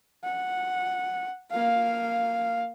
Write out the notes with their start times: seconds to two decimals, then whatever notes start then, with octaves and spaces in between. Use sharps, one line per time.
0.24 F#5
1.52 A#3 F5